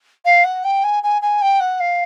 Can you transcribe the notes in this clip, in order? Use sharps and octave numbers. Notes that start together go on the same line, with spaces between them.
F5
F#5
G5
G#5
G#5
G#5
G5
F#5
F5